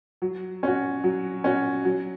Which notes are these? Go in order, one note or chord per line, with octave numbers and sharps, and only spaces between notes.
F#3
C#4 F#4
F#3
C#4 F#4
F#3